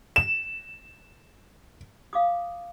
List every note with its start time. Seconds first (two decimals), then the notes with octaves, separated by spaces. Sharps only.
0.16 E7
2.13 F5 D6 D#6